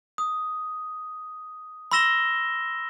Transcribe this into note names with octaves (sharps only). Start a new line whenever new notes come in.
D#6
B5 C6 E6 A#6 E7 G7